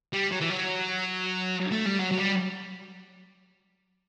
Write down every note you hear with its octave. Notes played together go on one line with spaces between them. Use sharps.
G3
F#3
E3
F#3
A3
G3
F#3
F#3
G3